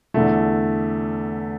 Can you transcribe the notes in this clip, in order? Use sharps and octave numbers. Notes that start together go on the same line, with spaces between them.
E2 D3 A3